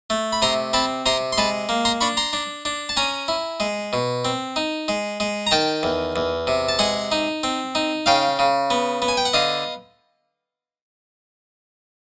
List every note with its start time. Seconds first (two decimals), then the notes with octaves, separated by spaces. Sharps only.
0.10 A3
0.32 B5
0.42 C3 A#5 C6
0.73 C4 A5 B5
1.06 C3 A#5 C6
1.32 C6
1.38 G#3 A5 B5
1.69 A#3
1.85 A#5 C6
2.01 D4 B5 C#6
2.17 A#5 C6
2.33 D4
2.65 D4
2.89 A5
2.97 C#4 G#5 A#5
3.28 E4
3.60 G#3
3.93 B2
4.25 C4
4.56 D#4
4.88 G#3
5.20 G#3
5.47 A#5
5.51 D#3 G5 A5
5.83 E2
6.16 E2
6.47 C3
6.69 A5
6.79 G#3 F#5 G#5
7.12 D#4
7.43 C4
7.75 D#4
8.06 C#3 F5 G5
8.39 C#3
8.70 B3
9.02 B3
9.08 G#5
9.17 G5
9.25 F#5
9.33 D3 D#5 F5